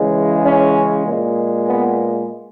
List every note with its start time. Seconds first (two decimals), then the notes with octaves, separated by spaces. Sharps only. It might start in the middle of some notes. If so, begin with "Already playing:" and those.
Already playing: C#3 E3 G#3
0.45 C#4
1.07 A#2 G#3
1.68 B3